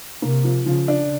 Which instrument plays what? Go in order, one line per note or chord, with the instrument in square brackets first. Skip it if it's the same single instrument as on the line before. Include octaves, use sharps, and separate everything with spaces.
[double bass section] C3 [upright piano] A#3
[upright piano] F3
[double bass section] C#3 [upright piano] F3
[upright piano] D4